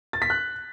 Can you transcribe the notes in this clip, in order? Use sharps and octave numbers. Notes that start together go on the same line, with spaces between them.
A6
B6
F#6